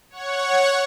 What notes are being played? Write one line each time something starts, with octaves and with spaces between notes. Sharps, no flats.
C#5 F#5 C#6